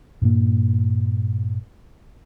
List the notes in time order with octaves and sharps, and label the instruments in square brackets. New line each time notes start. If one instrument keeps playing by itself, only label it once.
[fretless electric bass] G2 A#2 A#3